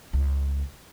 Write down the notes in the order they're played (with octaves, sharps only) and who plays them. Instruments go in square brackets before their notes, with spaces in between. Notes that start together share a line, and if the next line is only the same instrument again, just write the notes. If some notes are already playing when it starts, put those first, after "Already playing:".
[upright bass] C#2